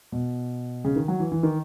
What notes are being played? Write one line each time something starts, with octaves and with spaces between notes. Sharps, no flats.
B2
C#3
D#3
F#3
E3
E3
D#3